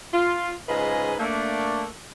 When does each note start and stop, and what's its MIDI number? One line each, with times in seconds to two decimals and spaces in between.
0.14 0.53 65
0.69 1.14 44
0.69 1.14 49
0.69 1.14 65
0.69 1.14 71
0.69 1.14 75
0.69 1.14 80
1.19 1.85 57
1.19 1.85 58
1.19 1.85 62